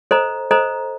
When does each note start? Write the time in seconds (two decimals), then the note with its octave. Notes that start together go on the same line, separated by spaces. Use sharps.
0.11 A4 C5 D#5 A#5
0.51 A4 C5 D#5 A#5